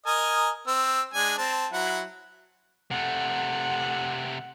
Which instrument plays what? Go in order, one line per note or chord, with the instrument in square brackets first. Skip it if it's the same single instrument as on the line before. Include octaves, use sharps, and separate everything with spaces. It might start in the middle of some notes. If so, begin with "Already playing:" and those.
[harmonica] A#4 D#5 G#5
C4 E6
G#3 D4 G#5
C4 A5
F#3 E4 F#5
[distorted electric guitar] C3 A3 [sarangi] F#5